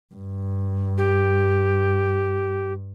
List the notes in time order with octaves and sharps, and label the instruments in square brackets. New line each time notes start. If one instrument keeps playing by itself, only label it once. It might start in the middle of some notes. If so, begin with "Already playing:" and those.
[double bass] G2
[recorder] G4